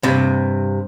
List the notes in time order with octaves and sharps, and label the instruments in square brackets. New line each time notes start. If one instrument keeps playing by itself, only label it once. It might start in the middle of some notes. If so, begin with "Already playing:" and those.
[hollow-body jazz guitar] G2 C3